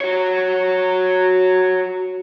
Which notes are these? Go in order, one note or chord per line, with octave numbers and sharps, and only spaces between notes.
F#4 C#5